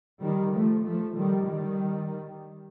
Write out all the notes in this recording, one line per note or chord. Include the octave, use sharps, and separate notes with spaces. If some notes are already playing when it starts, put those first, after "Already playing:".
D#3 G3
F3 A3
F3 A3
D#3 G3
D#3 G3